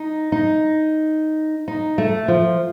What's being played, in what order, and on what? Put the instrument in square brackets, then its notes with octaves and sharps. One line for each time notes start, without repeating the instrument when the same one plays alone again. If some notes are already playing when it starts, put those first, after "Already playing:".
Already playing: [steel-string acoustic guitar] D#4
D#4
D#4
A3
F3